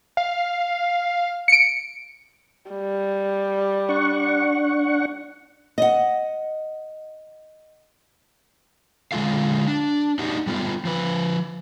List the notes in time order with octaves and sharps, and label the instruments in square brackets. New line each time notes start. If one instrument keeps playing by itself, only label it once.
[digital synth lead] F5
[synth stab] C#7 D7
[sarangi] G3
[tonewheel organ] D4 F#5 C#6
[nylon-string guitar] D#5 F#5
[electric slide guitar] D3 G#3 A#3 F4 A4 F5
D4
D4 D#4 F#4 G4
G3 A3 B3 F4
F3 B4